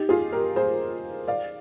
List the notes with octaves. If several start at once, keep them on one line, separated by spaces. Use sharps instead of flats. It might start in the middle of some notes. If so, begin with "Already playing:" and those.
Already playing: D#4 G4
F4 G#4
G4 A#4
G#4 C5
D5 F5